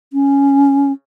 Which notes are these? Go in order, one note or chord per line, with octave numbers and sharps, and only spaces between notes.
C#4